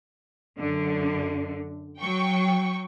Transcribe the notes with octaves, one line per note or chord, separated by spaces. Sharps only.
F#2 D3
F#3 G5 C#6